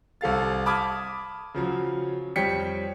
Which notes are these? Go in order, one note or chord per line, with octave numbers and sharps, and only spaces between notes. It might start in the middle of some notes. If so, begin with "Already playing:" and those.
C2 A4 F5 A6
A5 B5 D6 D#6 F6 G#6
C#3 F3 F#3
F2 G3 C#5 G5 B6 C#7